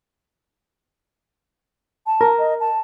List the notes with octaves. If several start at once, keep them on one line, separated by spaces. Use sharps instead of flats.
A5
A#4
D#5
A5